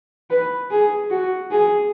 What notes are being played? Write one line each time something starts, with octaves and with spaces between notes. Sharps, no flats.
B4
G#4
F#4
G#4